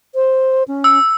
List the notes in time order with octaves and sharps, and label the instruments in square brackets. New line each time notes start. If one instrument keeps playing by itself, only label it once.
[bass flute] C5
C#4
[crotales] E6